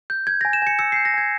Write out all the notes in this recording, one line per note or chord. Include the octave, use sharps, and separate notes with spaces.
G6
G6 G#6
A#6
G#5
E7
G#5 C#7
E6 C#7
C7
G6
A#6
G#5 G#6